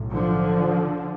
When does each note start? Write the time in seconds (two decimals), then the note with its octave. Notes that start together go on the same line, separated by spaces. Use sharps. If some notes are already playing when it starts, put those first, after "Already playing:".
Already playing: B1 A2
0.13 D3 F3